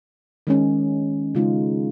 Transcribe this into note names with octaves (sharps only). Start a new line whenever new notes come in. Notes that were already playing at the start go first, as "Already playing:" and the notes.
D#3 G#3 C#4
C#3 G#3 D#4 F4